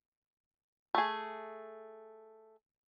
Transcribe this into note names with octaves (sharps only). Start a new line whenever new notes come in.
A3 G#4